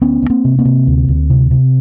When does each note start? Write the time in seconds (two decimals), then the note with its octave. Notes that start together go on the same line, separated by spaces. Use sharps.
0.02 D2 B3 C#4
0.22 D2
0.30 A#3 C4
0.45 C3
0.59 A#3 C4
0.65 C3
0.87 D2
1.08 D2
1.30 C3
1.51 C3